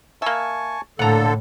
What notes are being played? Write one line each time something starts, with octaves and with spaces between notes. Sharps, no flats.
A#3 E5 G#5 A5 C#6
A2 D3 A#3 A4 F#5 A#5